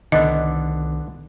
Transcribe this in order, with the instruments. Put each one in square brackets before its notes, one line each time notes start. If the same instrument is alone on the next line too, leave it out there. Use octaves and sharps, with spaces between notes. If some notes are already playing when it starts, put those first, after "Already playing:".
[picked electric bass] C2 D#3 [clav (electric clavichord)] D3 B3 D4 [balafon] D#5